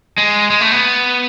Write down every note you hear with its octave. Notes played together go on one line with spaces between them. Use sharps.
G#3
G#3
A3
B3